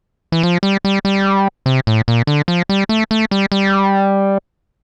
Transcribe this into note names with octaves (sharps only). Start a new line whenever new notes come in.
E3
F3
G3
G3
G3
C3
A2
A#2
D3
F3
G3
A3
A3
G3
G3